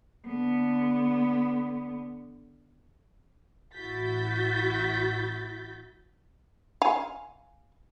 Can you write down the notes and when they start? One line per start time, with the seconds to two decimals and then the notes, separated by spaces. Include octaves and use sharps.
0.27 D3 B3
3.74 A1 E4 F#4 G6 A6 B6
6.82 F5 G#5